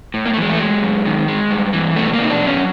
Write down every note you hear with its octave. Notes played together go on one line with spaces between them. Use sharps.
A2
A#3
A3
E3 G#3
A3
F#3 G#3
F#2
D#3
G#3
G2
E3
B2 A3
A#3
B2 D#4
D4
F#3
C#4